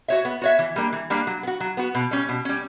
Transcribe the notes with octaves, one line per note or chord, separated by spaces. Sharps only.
F#4 C#5 E5
B3
F#4 C#5 E5
E3
G3 A#3 D4
E3
G3 A#3 D4
F#3
B3
F#4
F#3
B3 F#4
B2
G3 C#4
B2
G3 C#4